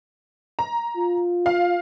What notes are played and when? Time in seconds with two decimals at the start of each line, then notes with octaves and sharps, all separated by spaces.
0.59 A#5
0.97 F4
1.46 F5